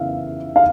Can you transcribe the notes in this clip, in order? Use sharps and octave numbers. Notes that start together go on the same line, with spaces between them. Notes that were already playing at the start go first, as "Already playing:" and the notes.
Already playing: C#3 E3 E5 F5
F5